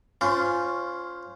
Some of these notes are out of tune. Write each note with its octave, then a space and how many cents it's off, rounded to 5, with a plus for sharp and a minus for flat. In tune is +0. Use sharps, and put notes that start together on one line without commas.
C#4 +0 F4 +0 C5 -25